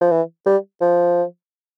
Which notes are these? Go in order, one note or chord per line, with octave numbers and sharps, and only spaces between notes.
F3
E3
G3
F3